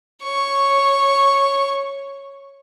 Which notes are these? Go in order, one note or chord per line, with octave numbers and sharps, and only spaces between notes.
C#5 C#6